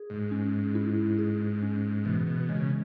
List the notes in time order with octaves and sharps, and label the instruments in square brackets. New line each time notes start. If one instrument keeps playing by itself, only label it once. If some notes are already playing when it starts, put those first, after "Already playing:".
Already playing: [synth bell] G#4
[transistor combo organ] G#2
[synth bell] C#4
E4
G#4
C#4
[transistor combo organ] B2 [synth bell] E3
[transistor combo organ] B2
[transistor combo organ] C#3 [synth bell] G#3